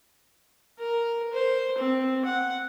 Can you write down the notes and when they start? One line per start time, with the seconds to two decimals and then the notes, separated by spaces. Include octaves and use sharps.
0.79 A#4
1.33 C5
1.78 C4
2.25 F#5